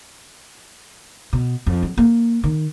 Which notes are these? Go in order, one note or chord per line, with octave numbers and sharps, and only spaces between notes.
B2
F2
F#3
A#3
D#3